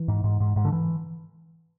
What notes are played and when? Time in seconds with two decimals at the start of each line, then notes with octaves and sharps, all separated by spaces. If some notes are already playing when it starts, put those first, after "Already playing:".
Already playing: E3
0.08 G#2
0.24 G#2
0.40 G#2
0.56 G#2
0.65 D3
0.72 E3